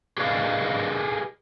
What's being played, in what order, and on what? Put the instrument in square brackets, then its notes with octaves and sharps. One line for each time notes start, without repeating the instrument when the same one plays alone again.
[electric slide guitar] G4 G#4 B4 D5 D#5 F5